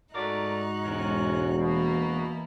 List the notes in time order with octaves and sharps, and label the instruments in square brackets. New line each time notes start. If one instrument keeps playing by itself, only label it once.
[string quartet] G#2 D#4 F#6 [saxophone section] A3 A#4 D5 [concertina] F#4
[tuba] E1 [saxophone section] C3 G#3 C#4
[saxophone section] B2 [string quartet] E3 A#3 E4